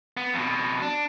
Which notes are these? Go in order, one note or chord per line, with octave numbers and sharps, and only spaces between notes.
B3
F2 B2
D4